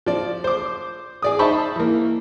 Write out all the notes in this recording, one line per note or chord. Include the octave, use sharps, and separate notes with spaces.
F3 D5
C5 D6
G#4 D5 D#6
D#4 C5 E5 A5 B5 C#6
E3 A#3